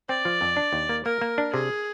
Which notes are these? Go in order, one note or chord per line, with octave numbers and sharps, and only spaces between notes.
C4 D5
F3
F2
D4
D#2
A#3
A#3 A#4
A#3
D4
C3 G#4